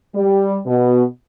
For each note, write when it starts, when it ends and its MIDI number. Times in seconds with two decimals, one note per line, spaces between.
0.15 0.58 55
0.66 1.03 47